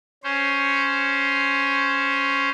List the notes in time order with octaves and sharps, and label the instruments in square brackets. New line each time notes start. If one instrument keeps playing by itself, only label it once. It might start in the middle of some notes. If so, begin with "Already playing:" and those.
[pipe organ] C#4 C5